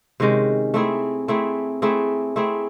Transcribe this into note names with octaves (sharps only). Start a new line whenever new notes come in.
C3 D#3 G#3 C#4
A3 C4 E4 G#4
A3 C4 E4 G#4
A3 C4 E4 G#4
A3 C4 E4 G#4